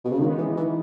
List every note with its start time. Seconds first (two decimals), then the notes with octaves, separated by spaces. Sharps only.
0.05 B2
0.12 C#3
0.19 D#3 G#3 B3 D#4
0.38 E3
0.57 E3